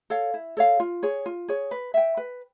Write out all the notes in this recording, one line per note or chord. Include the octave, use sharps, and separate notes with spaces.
A4 C#5 F5
E4
A4 C#5 F5
F4
G#4 C#5
F4
G#4 C#5
B4
E5 G5
B4